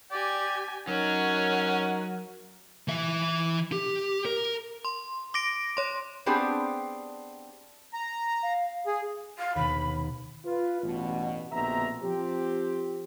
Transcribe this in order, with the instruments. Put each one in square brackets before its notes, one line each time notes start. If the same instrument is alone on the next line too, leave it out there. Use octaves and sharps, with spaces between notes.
[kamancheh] G4 G#5 [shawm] D5
[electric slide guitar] F#3 [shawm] C#4 [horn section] D#4 A#4 [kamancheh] C#5 F#5
[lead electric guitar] E3 E5
G4
A#4
[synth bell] C6
D6 A#6 D7
C#5 C6
[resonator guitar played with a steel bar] B3 C4 D4 G4 G#4 A5
[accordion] A#5
[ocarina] F5
[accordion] G#4
[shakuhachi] F5
[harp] D#2 B2 [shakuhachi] B5
[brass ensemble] F4 B4
A1 G2 B2
A#1 B2 D3 C4 E5 A#5
F3 C4 G4